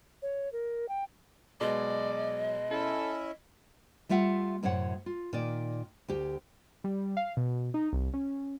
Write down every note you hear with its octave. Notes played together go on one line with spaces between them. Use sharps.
C#5
A#4
G5
B2 F#3 G#3 D5 D#5
C#4 E4 A4 E5
G3 A3 F4 E5 F#5
F#2 A2 C3 C#5 F#5
F4
A#2 D#3 D5
D2 G4
G3
F5
B2
D#4
C2
C#4